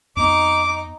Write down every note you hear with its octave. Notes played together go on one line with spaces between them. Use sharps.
F2 B3 D#4 D6